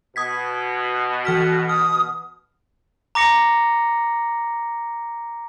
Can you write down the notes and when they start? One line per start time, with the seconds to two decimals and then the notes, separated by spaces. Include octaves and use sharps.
0.16 B2 D#6 G#6 B6
1.25 E3 F#4 F6 B6
1.69 D#6 F6
3.15 A#5 D6 A#6 C#7